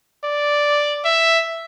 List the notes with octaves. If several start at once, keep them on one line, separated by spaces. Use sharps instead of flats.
D5
E5